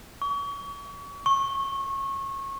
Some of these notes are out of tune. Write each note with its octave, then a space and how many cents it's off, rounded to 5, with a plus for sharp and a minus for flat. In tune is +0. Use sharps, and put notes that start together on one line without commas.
C#6 +35
C#6 -25